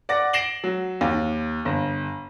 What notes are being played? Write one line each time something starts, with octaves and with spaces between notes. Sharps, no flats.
D5 F#5 D6 A#6
A#6 C7 D7 E7 F#7 G7
F#3
D#2
G1